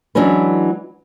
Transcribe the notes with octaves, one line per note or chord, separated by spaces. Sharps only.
E3 F#3 G#3 C#4 D4 B4